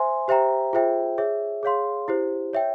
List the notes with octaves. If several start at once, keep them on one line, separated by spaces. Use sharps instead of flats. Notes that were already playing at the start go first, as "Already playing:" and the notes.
Already playing: C5 E5 G#5 C6
G4 C5 E5 G5 A#5
F4 G#4 C5 E5 G5
G#4 C#5 E5
G#4 C#5 F5 C6
E4 G4 C5
C#5 E5 G5